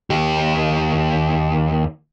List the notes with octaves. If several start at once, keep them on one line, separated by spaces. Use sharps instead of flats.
D#2 G4